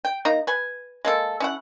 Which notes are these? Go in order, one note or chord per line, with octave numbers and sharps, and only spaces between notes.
G5
A#3 D#4 A#5
B4 G#5
G#3 A#3 A4
C#4 E4 F#5